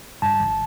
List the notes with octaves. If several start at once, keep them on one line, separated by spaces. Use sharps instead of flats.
G2 A5
G1